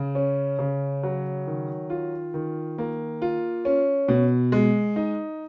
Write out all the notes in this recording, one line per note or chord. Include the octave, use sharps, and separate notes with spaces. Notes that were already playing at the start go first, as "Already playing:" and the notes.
Already playing: C#3
C#4
C#3
F#3
D#3
F4
D#3
A#3
F4
C#4
B2
G#3
D#4